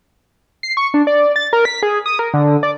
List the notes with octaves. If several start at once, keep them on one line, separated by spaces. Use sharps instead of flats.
C7
C#6
D4
D5
A6
A#4
B6
G#4
D#6
A#4
D3
D5